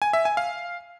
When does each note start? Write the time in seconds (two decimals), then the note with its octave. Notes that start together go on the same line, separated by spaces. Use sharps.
0.02 G#5
0.13 E5
0.25 G#5
0.37 F5